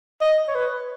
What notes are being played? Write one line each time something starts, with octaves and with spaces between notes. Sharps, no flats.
D#5
C#5
B4